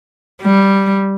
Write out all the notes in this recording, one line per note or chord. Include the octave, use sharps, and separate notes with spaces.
G3